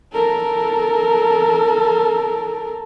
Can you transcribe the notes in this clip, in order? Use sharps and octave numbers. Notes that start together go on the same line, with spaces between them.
A4 A#4